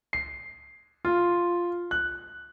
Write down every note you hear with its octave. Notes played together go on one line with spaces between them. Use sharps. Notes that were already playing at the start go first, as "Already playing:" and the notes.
C7
F4
F#6